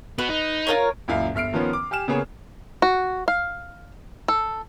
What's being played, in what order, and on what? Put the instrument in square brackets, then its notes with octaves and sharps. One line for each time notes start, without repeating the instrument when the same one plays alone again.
[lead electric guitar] B3 F#4 [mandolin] B4
[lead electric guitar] D#4
[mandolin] F4 A#4 C#5
[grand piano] C#2 F#2 A#2 E4 E5 F5
G1 E5 F6 C7 D7
D#3 F3 B3 C#4
D6
G4 G#5 F6 E7
C#3 A#3 B3 G#4 C#5
[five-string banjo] F#4
F5
A4